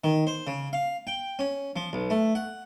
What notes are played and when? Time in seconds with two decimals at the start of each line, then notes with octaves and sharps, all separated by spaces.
0.04 D#3
0.27 C5
0.47 C#3
0.73 F5
1.07 G5
1.39 C#4
1.76 F3
1.93 B1
2.10 A3
2.35 F#5